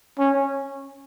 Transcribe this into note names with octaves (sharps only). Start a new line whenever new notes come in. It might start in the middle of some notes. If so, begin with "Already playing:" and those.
C#4